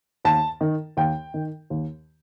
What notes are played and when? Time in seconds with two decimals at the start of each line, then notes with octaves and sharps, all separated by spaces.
0.25 D#2 A5
0.61 D#3
0.97 D#2 G5
1.34 D#3
1.70 D#2